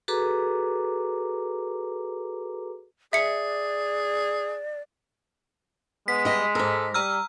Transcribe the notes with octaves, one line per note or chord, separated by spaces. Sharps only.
F#4 G#4 A4 B4 A#5 D6
G#4 D5 E5 C#7
G#3 B3 B6
G3 D#5
G#2 A4 A#4
G3 A#5 E6 F6